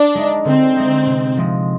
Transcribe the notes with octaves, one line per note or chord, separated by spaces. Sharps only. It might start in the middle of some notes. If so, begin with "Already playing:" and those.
Already playing: D4
G#3 D#4
D3 C4
G#3 D#4
C3
F3 G#3 C4